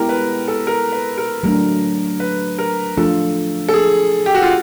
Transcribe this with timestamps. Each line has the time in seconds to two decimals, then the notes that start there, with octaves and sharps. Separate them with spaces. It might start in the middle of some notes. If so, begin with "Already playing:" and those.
Already playing: G#3 B3 E4 G4 A#4
0.09 B4
0.48 A4
0.67 A#4
0.92 B4
1.18 A#4
1.43 F#3 A3 D4 A#4
2.20 B4
2.59 A#4
2.97 F3 A3 D4 F4 A4
3.69 A4
3.74 G#4
4.26 G4
4.35 F#4
4.43 F4